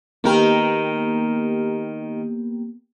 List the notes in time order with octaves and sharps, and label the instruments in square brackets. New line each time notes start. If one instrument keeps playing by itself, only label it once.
[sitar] D#3 A#4 [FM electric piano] A#3 B3 G4